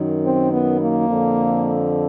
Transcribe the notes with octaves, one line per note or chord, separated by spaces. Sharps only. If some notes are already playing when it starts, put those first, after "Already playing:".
Already playing: F#2 D#3
C4
B3
A#3
F2 D3